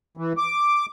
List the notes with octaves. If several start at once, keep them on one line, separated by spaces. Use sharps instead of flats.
E3
D6